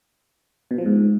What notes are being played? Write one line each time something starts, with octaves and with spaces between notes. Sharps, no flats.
B2
F3
G#2